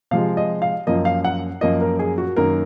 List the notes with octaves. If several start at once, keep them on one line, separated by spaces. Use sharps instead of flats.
C3 F3 G#3 F5
D#5
F5
F#2 F3 A#3 D#5
F5
F#5
F#2 F3 A#3 D#5
A#4
G#4
F#4
F#2 D#3 A#3 A#4